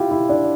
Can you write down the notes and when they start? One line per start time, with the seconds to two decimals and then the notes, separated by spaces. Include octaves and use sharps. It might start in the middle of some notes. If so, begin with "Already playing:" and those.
Already playing: E4 F4 G4
0.11 E4
0.29 D4